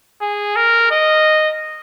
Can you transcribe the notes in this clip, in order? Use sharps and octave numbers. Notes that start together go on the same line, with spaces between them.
G#4
A#4
D#5